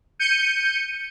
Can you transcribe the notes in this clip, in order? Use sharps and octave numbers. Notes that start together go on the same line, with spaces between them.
G6 C#7 D#7